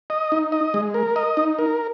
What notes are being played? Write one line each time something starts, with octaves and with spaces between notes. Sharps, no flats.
D#5
D#4
D#5
G#3
A#4
D#5
D#4
A#4